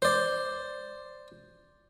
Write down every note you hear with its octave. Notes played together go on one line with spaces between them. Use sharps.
C5 D5